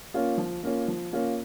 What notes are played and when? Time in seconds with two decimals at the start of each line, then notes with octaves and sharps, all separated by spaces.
0.14 A#3 C#4 F4
0.38 F3
0.63 A#3 C#4 F4
0.88 F3
1.13 A#3 C#4 F4